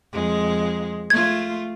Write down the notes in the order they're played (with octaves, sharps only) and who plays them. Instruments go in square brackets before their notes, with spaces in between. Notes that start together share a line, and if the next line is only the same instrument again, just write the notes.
[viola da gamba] F2 G#3
[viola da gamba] A3 F4 [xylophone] G#6